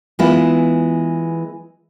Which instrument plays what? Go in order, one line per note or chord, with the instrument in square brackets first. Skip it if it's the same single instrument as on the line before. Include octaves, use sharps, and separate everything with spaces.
[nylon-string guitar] E3 G#3 B3 E4 F4